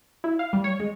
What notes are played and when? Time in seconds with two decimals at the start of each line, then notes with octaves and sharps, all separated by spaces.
0.24 E4
0.39 F5
0.53 G3
0.64 C#5
0.80 G#3